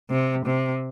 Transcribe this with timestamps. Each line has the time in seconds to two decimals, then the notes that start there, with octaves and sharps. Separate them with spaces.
0.10 C3
0.46 C3